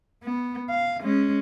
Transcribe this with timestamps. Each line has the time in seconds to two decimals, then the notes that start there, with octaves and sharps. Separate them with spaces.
0.24 B3
0.70 F5
1.01 G#3 C#4